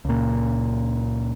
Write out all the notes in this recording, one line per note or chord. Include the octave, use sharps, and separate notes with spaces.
C#2 A#2